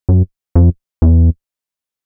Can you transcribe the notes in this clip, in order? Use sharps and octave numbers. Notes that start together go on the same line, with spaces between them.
F#2
F2
E2